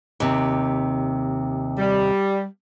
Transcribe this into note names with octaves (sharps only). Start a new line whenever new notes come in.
D#2 C3
G3